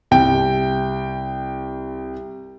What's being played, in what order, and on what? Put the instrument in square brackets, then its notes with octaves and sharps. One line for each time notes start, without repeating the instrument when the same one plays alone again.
[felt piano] C2 G5